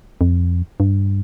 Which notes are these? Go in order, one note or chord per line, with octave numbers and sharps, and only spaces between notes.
F2
G2